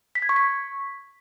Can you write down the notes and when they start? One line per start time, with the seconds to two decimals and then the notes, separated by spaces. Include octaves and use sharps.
0.15 B6
0.22 G#6
0.29 C#6
0.36 B6